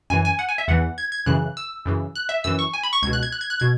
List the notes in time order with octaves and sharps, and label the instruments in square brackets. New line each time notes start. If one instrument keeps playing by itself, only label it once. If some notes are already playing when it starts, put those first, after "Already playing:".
[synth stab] F#2 E3 G#5
G#5
F#5
G#5
E5
E2 E3 F#5
G#6
G#6
F#2 C#3 E3 F#6
E6
F#2 C#3 E3
F#6
E5
F#2 E3 E6
C#6
G#5
B5
C#6
C#2 G#6
B2
F#6
G#6
F#6
G#6
F#6
B2 G#6